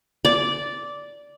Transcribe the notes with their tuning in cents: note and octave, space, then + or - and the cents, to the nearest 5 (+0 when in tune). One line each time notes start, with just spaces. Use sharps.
D5 -10